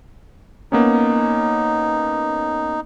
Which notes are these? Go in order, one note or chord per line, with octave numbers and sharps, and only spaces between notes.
A#3 B3 C#4 D#4